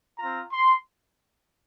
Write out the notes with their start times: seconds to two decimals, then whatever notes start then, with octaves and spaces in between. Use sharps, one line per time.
0.19 C4 F4 A#5
0.51 C6